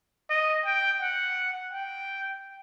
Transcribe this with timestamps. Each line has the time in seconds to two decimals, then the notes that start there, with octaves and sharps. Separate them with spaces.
0.29 D#5
0.65 G5
1.01 F#5
1.73 G5